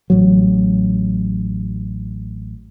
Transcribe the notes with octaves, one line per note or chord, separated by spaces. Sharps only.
A1 F#3